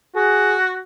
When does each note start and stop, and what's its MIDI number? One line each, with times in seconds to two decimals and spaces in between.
0.16 0.81 66
0.16 0.57 68